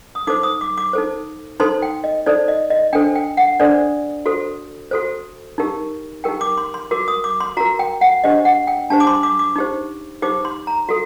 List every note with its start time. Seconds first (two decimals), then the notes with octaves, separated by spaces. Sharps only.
0.15 D#6
0.27 D#4 A4 C5 D6
0.43 D#6
0.61 D6
0.77 D6
0.93 D#4 A4 C5
1.60 D#4 A4 C5 C6
1.82 G5
2.04 D#5
2.26 D#4 A4 C5 D5
2.48 D#5
2.70 D#5
2.93 D4 A4 C5 G5
3.15 G5
3.37 F#5
3.60 D4 A4 C5 D5
4.26 F#4 A4 C5
4.91 F#4 A4 C5
5.58 D#4 G4 A#4
6.24 D#4 G4 A#4 G5
6.41 D6
6.58 C6
6.74 C6
6.91 F#4 A#4 D6
7.08 D#6
7.24 D6
7.40 C6
7.57 F#4 A#5
7.60 A#4
7.79 G5
8.01 F#5
8.24 D4 G4 C5 D#5
8.45 F#5
8.67 G5
8.90 D4 G4 C5 A5
9.00 D6
9.07 C6
9.23 D6
9.39 D6
9.56 D#4 G4 C5
10.22 D#4 G4 C5 D6
10.45 C6
10.67 A#5
10.89 F#4 A4